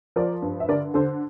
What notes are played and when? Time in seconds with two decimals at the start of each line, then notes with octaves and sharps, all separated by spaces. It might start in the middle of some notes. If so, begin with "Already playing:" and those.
0.16 F3 A#4 D5
0.42 G2
0.60 E5
0.68 D3 A#4 D5
0.94 D3 A4 C5